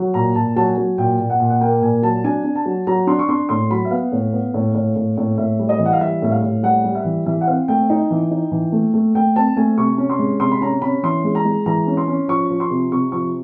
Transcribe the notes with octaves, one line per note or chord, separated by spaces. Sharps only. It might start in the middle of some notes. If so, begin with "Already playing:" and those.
Already playing: F#3
A#2 A#5
A#2 A5
F#3 A5
G#5
F#3
A#2 G5
A#2
F#5
A#2
F#5
A#3 G5
A#2 G#5
F#3 A5
D4 G#5
D4
A5
F#3
F#3 A#5
D4 C6
C#6
D4 C6
A2 C6
F#3 B5
E5
B3 F5
A2
B3
A2
A2
A2
A2
A2 E5
G3
D#5
E3
F#5
F5
G3 E5
A2 E5
F5
A2
G3 F#5
G3
E5
E3
E3 E5
F#5
C4 F5
A3 G5
D#4
E3
D#4
E3
A3
A3
A3 G5
C4 A5
A3 G#5
C3 C#6
C#4
C6
G#3
C3 C6
B5
C#4 A#5
C#4 B5
E3 C6
G#3
A#5
G#3
E3 A#5
C#4
C6
C#4
F3 C#6
F3
C6
C3
C3 C#6
F3 C#6